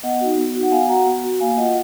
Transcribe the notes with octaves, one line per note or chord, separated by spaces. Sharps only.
B3 D#5 F#5
D#4 F#4
B3
D#4 F#4
F#5
B3 F5 G#5
F#4 F#5 A#5
B3
F#4
A#3 F5 G#5
F4 D#5 F#5